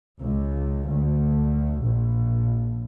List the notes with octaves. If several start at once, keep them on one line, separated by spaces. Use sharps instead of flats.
C#2
D2
A#1